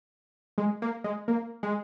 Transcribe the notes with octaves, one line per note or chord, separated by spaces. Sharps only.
G#3
A#3
G#3
A#3
G#3